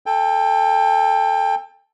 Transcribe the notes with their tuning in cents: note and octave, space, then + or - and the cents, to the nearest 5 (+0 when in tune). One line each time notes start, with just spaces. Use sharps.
A4 +0 G5 +30